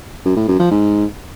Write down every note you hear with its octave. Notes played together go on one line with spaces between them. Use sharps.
F#2
A2
F#2
F3
G#2